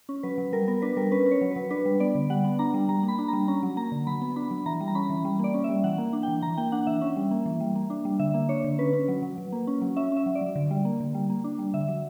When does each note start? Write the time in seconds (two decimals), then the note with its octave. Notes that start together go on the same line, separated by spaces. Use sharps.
0.09 C#4
0.23 F#3 B4
0.38 F#3
0.53 G3 A#4
0.68 B3 A#4
0.82 D4 B4
0.97 G3 A#4
1.12 C#4 B4
1.26 C#4
1.31 C#5
1.41 F#3
1.51 B4
1.56 F#3
1.70 D4 B4
1.85 G3
2.00 B3 D5
2.15 D3
2.30 G3 F#5
2.44 B3
2.59 D4 A#5
2.74 G3
2.89 G3 A#5
3.03 A#3
3.08 B5
3.19 D4
3.28 G3 A#5
3.48 C#4 A#5
3.63 F#3
3.77 A#3 A#5
3.92 D3
4.07 F#3 B5
4.21 B3
4.36 D4 B5
4.51 F#3
4.66 E3 A#5
4.80 G3
4.88 A#5
4.95 C#4 B5
5.10 E3
5.25 G3
5.39 A#3 D5
5.54 C#4
5.64 G3 E5
5.84 E3 F#5
5.98 A#3
6.13 D4
6.23 E3 G5
6.42 E3 A#5
6.57 A#3 G5
6.72 D4 F#5
6.87 E3 E5
7.01 C#4
7.16 G3
7.31 A#3
7.46 E3
7.60 G3
7.75 A#3
7.90 D4
8.05 G3
8.19 D3 E5
8.34 A#3
8.49 D4 C#5
8.64 D3
8.79 C#4 B4
8.93 C#4
9.08 F#3
9.22 F#3
9.38 F#3
9.52 A#3
9.67 C#4
9.82 F#3
9.96 C#4 E5
10.12 C#4 E5
10.26 F#3
10.35 D5
10.41 F#3
10.55 D3
10.71 G3
10.85 A#3
11.00 D3
11.14 G3
11.30 A#3
11.44 D4
11.59 G3
11.74 D3 E5
11.88 F#3